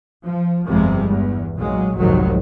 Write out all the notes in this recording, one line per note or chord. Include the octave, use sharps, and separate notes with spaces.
F3
G1 F2 C3 G3 G#3
E2 G2
B1 A#2 F#3 G#3
F1 C2 G#2 D#3 F#3